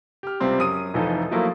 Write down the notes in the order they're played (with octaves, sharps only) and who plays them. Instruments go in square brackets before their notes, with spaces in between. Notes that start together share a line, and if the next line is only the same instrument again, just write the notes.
[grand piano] G4 F6
C#2 C3 G3 C4 C6
F#2 D#6 D#7
F1 E3 F3 D#4 A4 G#5
F3 F#3 A3 A#3 E4 F4